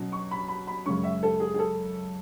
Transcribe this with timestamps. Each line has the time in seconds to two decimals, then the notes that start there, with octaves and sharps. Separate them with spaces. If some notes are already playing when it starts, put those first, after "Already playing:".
Already playing: B2 F#3 C#4
0.12 C#6
0.31 B5
0.48 B5
0.67 B5
0.85 F#2 C#3 G#3 C#4 C#6
1.03 E5
1.23 A4
1.40 G#4
1.54 G#4
1.59 A4